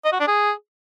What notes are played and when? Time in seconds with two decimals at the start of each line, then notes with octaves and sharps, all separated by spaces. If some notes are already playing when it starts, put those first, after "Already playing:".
0.05 D#5
0.12 F#4
0.20 D4
0.28 G#4